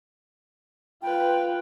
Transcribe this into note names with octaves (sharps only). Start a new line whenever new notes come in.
F4 B4 G5